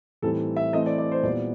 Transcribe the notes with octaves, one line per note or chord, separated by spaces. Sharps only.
A2 E3 G3 C4 D#4 A4
E5
E3 A3 C4 D#5
D5
D5
C5
A#2 G3 B3 E4 D5